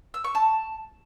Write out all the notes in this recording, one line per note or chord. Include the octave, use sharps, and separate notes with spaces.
E6
C#6
A5